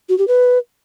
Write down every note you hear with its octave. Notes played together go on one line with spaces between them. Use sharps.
F#4
G4
B4